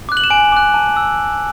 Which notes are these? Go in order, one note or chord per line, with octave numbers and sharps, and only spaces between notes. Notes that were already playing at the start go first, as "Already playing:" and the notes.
D6 F#6
F#7
E7
G#5 D7
D6 F#6
A5
E6